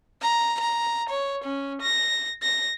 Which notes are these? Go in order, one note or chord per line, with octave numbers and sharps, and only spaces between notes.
A#5
A#5
C#5
C#4
A#6
A#6